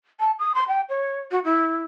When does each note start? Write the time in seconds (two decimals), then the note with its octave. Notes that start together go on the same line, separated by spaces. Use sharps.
0.20 A5
0.39 D#6
0.55 C6
0.68 G5
0.89 C#5
1.31 F#4
1.44 E4